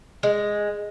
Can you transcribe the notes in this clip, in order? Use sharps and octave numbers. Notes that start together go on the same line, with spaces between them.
G#3